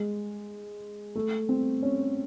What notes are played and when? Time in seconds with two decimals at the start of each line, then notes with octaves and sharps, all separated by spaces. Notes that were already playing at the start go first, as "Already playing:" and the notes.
Already playing: G#3
1.15 A3
1.49 C4
1.83 C#4